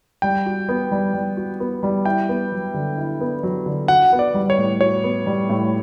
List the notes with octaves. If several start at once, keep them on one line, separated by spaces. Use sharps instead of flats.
G3 G5
F#4
B3
G3
G3
F#4
B3
G3
E4 G5
B3
F#3
D3
E4
B3
F#3
D3
F#4 F#5
B3
D5
G3
C#5
A2
F#4 C#5
B3
G3
A2